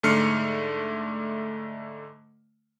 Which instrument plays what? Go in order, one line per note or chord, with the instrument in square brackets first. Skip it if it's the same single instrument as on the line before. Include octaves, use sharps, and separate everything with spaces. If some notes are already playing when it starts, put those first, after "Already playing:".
[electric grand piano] G#2 D3 A3 F6 C7 C#7